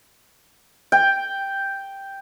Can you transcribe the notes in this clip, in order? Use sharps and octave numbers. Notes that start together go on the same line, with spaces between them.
G5